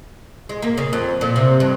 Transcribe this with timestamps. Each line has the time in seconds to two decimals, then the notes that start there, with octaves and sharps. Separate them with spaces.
0.49 G#3
0.62 A#3
0.77 C#3
0.93 F2
1.21 A#2
1.36 C3
1.60 G2